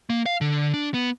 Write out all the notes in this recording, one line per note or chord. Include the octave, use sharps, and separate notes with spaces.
A#3
F5
D3
D4
B3